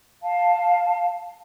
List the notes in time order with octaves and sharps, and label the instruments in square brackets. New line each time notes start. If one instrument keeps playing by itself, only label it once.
[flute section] F5 A5